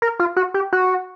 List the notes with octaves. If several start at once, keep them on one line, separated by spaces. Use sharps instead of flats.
A#4
F4
F#4
G4
F#4